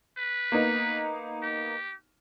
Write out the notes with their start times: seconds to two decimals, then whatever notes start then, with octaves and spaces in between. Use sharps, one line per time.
0.18 B4
0.52 A#3 B3 D#4
1.43 G4